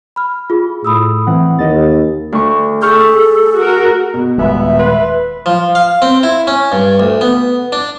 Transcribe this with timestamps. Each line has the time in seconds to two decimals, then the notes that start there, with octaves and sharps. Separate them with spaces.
0.16 B5 F6
0.50 F4 G#4
0.85 A2 B5 D#6 E6
1.27 E3 C4 F#5
1.59 D#2 D#5 A6
2.32 D2 C#6
2.82 G#4 A4 C#6 F6 G6
3.56 F#4 A#4
4.14 B2
4.38 D#1 G#3 B3 E5
4.79 B4 C6
5.46 F3
5.75 F5
6.02 C4
6.23 E4
6.47 C#4
6.72 G2
7.00 D2
7.21 B3
7.72 D4